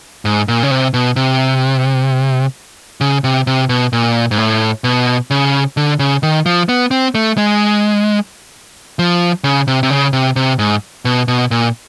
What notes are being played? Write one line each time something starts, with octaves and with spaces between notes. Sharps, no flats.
G#2
A#2
C#3
C3
B2
C3
C#3
C3
C3
B2
A#2
G#2
A2
B2
C#3
D3
C#3
D#3
F3
B3
C4
A3
G#3
F3
C#3
C3
C3
C#3
C3
C3
G#2
B2
B2
A#2